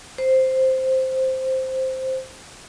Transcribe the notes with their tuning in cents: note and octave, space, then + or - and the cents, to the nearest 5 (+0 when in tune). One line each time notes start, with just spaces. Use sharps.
C5 +0